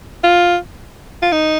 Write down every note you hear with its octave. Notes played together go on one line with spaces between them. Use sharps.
F4
F4
D#4